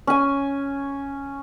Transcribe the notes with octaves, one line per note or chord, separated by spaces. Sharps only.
C#4 G#5